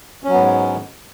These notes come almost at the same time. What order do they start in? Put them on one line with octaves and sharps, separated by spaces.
C#4 F#3 B3 G#2 G#3